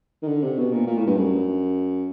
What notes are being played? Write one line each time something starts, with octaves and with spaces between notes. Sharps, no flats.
D#3
D3
C3
B2
A#2
A#2
A2
G2
F#2